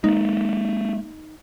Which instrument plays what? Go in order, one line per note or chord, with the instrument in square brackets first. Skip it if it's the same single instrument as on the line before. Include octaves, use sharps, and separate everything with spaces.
[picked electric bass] G#3 A#3 [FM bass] D#4